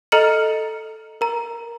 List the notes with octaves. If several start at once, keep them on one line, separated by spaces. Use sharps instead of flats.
A4 D#5 A#5 F6 C#7 F#7
A#4 A#5